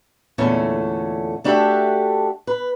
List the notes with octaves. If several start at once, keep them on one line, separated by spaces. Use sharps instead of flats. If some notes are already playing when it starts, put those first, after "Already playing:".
E2 A#2 D3 A3 C#4
A3 D4 F#4 G4 A4 E5
B4